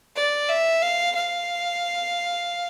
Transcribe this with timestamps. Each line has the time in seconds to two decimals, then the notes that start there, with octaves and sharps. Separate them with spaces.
0.16 D5
0.49 E5
0.83 F5
1.15 F5